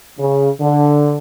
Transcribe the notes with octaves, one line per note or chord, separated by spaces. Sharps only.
C#3
D3